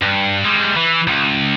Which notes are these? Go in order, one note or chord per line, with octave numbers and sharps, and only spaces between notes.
G2
G3 G#3
E3
C#2